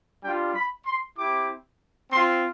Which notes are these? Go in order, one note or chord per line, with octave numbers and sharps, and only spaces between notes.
G3 D4 F4 G5
B5
C6
C4 E4 G4 D6
C4 F4 C6